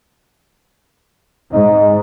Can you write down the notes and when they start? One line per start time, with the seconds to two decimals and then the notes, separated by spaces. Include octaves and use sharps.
1.53 G#2 D#4